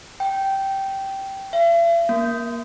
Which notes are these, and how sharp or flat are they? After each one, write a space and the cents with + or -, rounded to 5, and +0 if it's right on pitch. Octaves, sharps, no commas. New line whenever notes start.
G5 -10
E5 +45
A#3 +20